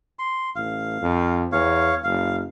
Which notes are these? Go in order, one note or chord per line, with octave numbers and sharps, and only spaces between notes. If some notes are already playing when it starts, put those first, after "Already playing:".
C6
A1 F5
F2
E2 C#5 F5
F#1 F5